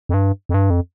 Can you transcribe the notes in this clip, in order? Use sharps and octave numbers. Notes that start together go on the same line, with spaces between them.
F2
G2
F2
G2
F2